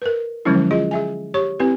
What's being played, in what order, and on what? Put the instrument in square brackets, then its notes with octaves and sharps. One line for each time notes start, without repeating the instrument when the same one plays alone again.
[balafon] A#4 B4
D3 F3 F#3 G#3 C#4 E4
F4 G#4 D#5
G#4 E5 G#5
G4 C#5 C#6
C4 E4 G4 B4